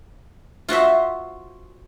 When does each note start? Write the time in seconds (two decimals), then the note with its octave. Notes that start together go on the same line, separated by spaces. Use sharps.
0.69 F4 F#4 C5 E5